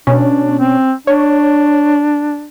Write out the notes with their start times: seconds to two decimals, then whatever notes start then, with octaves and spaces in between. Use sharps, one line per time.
0.07 B2 C#4 D4
0.59 C4
1.07 D4 C#5